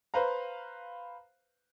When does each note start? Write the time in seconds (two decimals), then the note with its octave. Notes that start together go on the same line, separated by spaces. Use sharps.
0.14 B4 C5 F5 A#5